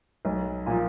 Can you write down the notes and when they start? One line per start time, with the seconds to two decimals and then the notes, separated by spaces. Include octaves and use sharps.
0.25 B1
0.66 A#2 F3